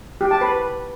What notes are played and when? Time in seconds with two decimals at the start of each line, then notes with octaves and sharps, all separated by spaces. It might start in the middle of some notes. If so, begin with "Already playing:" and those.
0.21 G4
0.31 A5
0.41 B4